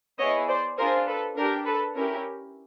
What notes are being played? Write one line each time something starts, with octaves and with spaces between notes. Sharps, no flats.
B3 E4 G#4 C#5 D#5
C5 D5
D4 F4 G#4 A#4 C5
A4 B4
D4 G4 A#4
A4 B4
C#4 E4 G4 A#4